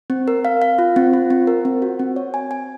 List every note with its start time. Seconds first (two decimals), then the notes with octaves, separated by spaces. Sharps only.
0.10 C4
0.28 A#4
0.45 F5
0.62 F5
0.79 F4
0.96 C4
1.13 F4
1.30 C4
1.47 A#4
1.65 C4
1.82 F#4
1.99 C4
2.16 C#5
2.34 G#5
2.51 G#5